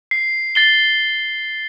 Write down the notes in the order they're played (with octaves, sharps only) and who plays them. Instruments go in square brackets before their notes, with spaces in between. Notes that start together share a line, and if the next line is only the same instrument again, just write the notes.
[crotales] C7
A6 C7 G7